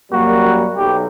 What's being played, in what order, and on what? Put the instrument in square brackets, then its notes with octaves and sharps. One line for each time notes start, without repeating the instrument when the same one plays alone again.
[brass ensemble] F#2 G3 A#3 [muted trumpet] F#4
[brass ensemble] B1 [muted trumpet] G4